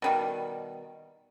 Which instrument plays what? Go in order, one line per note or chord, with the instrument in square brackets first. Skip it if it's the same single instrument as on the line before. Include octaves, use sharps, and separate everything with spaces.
[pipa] B2 D#3 G3